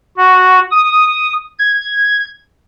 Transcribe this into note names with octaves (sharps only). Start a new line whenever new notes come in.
F#4
D#6
G#6